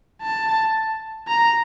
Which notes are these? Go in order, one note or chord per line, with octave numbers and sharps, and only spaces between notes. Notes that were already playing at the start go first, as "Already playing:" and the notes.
A5
A#5